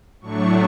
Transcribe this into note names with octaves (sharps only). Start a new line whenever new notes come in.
A2 F#3 A3 D4 C#6